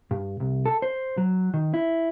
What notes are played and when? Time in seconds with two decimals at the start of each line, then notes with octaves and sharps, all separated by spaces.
0.11 G2
0.40 C2
0.66 A4
0.82 C5
1.18 F#3
1.54 D#3
1.74 E4